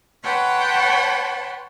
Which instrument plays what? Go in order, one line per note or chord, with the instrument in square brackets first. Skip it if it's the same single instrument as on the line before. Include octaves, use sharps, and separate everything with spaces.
[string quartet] B4 C#5 F#5 G5 A5 C6